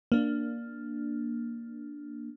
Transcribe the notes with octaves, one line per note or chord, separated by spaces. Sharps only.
A#3 D4